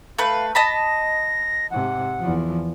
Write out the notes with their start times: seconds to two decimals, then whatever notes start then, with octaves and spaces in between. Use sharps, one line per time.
0.18 A3 B4 F5
0.55 D#5 A5 B5 A#6
1.71 G#2 C3 F#5
2.19 E2 F3